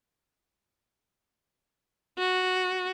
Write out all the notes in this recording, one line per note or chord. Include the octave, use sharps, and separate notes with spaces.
F#4